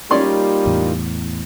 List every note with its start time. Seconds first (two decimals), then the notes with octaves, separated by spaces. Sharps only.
0.11 G3 A#3 C#4 D#4 F4 D5 C6
0.66 E2 A2